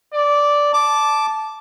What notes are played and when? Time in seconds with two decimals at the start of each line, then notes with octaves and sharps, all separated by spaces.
0.14 D5
0.74 A5 D6